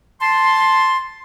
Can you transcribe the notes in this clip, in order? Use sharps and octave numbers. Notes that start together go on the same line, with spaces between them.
A5 C6